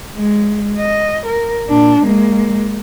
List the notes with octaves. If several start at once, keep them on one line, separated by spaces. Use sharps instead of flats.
G#3
D#5
A#4
A#2 D4
G#3 A#3